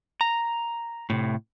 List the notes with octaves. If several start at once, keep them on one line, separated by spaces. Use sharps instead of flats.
A#5
A2 C3